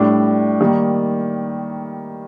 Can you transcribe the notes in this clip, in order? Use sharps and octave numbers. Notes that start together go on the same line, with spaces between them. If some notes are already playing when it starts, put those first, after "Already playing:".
Already playing: A2 G3 D4
D#3 G3 A#3